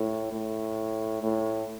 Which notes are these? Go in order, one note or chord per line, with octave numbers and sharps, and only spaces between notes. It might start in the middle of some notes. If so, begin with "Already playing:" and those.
Already playing: A2
A2
A2